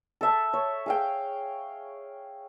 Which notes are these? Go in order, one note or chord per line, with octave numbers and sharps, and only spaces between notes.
A4 E5 A5
C#5
G#4 F5 G5